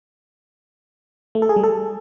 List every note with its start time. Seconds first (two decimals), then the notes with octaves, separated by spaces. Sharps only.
1.35 A3
1.42 A4
1.49 G#4
1.56 G3
1.64 A4